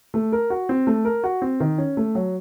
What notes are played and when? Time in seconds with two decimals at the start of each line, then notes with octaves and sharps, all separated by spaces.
0.14 A3
0.33 A#4
0.50 F#4
0.69 C4
0.87 A3
1.05 A#4
1.24 F#4
1.42 C4
1.60 D#3
1.78 C#4
1.97 A3
2.15 F#3